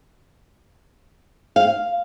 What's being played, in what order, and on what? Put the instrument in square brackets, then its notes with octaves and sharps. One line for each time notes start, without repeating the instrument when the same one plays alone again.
[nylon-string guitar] F5